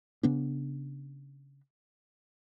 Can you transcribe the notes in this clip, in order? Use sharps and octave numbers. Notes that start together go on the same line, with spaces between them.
C#3 B3 D4